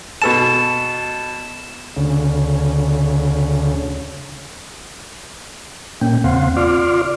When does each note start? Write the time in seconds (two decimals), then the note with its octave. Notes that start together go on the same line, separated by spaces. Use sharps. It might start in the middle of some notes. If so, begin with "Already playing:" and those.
0.22 B2 A4 A5 E7
1.97 D2 C#3
6.01 A#2 A#3 C#4 G5
6.24 E2 C#3 C4 F5 F#5 C6
6.56 F4 D5 C6 D6 F6